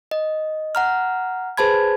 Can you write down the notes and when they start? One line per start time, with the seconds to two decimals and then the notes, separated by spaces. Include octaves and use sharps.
0.11 D#5
0.75 F#5 A#5 F6
1.57 G#4 B4 C5 A5 B5 G#6